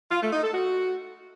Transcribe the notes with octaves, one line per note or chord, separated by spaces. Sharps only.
F4
A3
D#4
A4
F#4